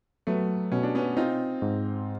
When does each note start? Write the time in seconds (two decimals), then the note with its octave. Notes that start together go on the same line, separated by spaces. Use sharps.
0.27 F#3 A3 B3
0.72 B2 C#4
0.83 D4
0.95 B3 C#4
1.17 C4 D#4 F4
1.62 G#2